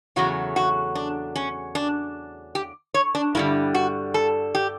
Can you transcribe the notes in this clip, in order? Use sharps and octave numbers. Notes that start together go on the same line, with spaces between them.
E2 C#3 F#3 A3 F#4
F#4
D4
C#4
D4
G4
C#5
D4
G2 D3 G3 E4
F#4
A4
G4